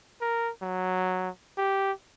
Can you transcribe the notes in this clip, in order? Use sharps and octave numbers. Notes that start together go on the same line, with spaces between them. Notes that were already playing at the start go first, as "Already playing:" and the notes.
A#4
F#3
G4